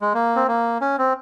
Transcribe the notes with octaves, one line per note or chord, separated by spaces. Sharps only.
G#3
A#3
C4
A#3
C#4
C4